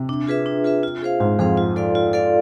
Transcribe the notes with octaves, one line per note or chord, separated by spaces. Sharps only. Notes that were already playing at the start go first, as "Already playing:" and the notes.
Already playing: C3
D4
F4 G#4 B4 E5
D4
F4 G#4 B4 E5
F4
G#4 C5 F5
G#2 F4
F2 G#4 C5 F5
F4
A4 D5 F5
F4
A4 D5 F5